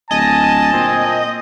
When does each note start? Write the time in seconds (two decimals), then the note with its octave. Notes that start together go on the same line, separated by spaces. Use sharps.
0.11 D1 D#5 G#5 A5
0.73 A#2 C4